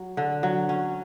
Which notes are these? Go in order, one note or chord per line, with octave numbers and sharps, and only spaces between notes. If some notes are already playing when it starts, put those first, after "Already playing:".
Already playing: F#3
D3
F#3
C#4